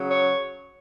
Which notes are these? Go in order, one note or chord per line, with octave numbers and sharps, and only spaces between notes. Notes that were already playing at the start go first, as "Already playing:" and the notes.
Already playing: C#3 F#3 C#4
C#5